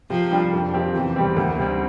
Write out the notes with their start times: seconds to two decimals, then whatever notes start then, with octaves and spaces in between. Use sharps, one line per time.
0.10 C3 F3
0.31 G3 D4 G4
0.53 F2
0.74 C3 F3 C4 G4
0.94 E2 E3
1.16 C3 G3 C4
1.36 D2 D3
1.58 C3 G3 C4